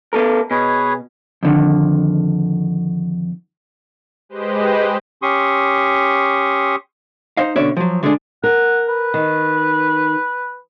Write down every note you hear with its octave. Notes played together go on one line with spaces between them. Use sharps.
B3 A4 A#4
B2 G#4 B4 C#5
F2 D3 D#3
G#3 G4 B4 C5 D#5
C#4 G4 C6 C#6 D#6
D#4 C5 D#5 F5
B2 D3 C#4 C#5 D5 E5
F3 F#3
D3 G#3 A3 C#4 D4 G#4
A#4 F#5
B4
D#3